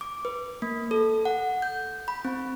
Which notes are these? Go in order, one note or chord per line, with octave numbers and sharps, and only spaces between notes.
D6
B4
A#3
A4
F#5
G6
B5
C4